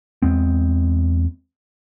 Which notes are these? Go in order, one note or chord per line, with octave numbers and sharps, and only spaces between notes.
E2 G#3 B3 C4